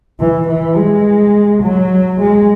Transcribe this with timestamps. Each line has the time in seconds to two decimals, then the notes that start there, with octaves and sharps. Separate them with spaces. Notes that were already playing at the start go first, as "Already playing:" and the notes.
0.20 E3
0.48 E3
0.77 G#3
1.63 F#3
2.20 G#3